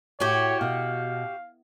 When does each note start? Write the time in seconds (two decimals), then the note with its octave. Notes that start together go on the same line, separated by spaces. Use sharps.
0.20 A2 F#4 G4 C#5
0.61 B2 F5